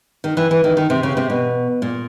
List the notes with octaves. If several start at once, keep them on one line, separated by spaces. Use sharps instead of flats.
D#3
E3
E3
D#3
D#3
C3
C#3
C3
B2
A#2